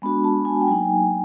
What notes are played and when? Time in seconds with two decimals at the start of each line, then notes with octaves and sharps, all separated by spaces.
0.02 G#3 B3 D4 F#4
0.24 A5
0.45 G#5
0.62 G5
0.68 F#3 A#3 D#4 G#5